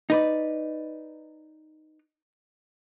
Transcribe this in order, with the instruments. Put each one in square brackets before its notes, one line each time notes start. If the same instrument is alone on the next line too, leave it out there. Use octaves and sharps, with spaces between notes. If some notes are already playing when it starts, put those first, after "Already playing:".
[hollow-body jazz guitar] D#4 B4 D5